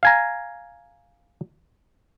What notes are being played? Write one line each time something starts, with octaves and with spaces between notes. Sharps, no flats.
F5 G#5 A#5